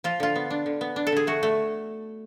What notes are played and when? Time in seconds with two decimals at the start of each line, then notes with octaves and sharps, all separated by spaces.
0.04 F3 F4
0.20 D3 F4
0.36 B3
0.50 D4
0.66 D3
0.81 B3
0.96 D4
1.07 A4
1.12 D3 G#4
1.27 A3 F#4
1.43 A3